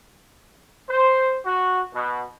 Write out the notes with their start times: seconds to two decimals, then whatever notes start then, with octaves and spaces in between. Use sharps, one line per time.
0.89 C5
1.46 F#4
1.93 B2